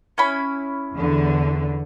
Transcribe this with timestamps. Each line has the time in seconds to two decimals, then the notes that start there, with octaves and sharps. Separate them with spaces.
0.18 C#4 E4 B5
0.95 E2 D3